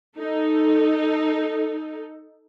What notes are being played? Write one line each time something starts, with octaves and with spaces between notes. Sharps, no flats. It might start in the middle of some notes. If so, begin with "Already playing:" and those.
D#4 A4